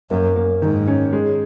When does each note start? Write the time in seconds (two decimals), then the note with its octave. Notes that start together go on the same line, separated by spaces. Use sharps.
0.10 F#2 A#3
0.36 A#3
0.62 G#2 D#3
0.87 C#4
1.13 G#3